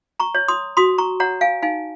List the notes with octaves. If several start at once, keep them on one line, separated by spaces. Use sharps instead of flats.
A#5 C#6
C#5
C6 D#6
F#4 C6 D#6
A#5 C#6
C#5 F#5 A#5
F5 G#5
D#4 F5 G#5